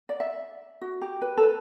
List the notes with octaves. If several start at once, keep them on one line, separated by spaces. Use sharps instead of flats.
D5
E5
F#4
G4
B4
A4
B4